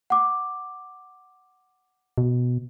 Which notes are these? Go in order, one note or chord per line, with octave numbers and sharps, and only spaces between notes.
F#5 D6
B2